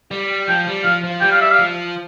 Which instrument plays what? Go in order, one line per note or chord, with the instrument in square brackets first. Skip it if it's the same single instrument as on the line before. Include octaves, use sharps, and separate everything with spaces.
[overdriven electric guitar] G3
[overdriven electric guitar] F3 [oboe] G5
[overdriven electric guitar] G3
[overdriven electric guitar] F3 [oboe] F5
[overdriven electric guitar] F3
[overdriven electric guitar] G3 [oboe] G5
[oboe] F5
E5
F5
[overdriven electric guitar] F3